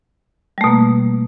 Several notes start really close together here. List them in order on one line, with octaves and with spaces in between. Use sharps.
G3 A3 B2 A#3